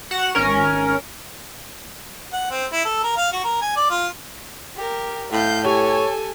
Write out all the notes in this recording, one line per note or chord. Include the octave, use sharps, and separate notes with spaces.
F#4 F#5 E7
G#1 C#4 A#4
F#5
C4
E4
A4
A#4
F5
F#4
A#4
G#5
D5
F4
G4 A#4
A2 F5 G6
G4 A4 C#5 G#5